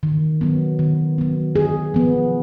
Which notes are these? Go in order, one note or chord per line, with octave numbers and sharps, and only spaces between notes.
D#3
F#3 B3
D#3
F#3 B3
D3 G#4
F3 B3